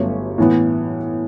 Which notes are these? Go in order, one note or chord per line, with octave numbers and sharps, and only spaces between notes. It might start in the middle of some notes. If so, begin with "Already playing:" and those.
Already playing: G1 G2 F#3 A3 C#4
A2 E3 B3